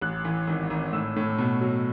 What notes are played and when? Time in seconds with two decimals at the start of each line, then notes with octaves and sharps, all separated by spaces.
0.01 A1 F#6
0.24 E3
0.47 G#1
0.70 G#1
0.93 A2 E6
1.16 A2
1.38 B2
1.61 F#3